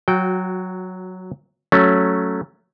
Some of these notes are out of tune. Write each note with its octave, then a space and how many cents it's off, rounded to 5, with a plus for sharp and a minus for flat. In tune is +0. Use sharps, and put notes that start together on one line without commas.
F#3 +0 F#4 -20 G5 -15
F#3 +0 A3 +0 C#4 +0